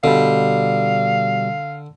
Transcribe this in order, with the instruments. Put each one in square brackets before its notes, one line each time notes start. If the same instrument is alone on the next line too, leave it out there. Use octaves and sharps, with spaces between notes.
[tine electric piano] B2 G3 [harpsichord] D3 [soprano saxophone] F5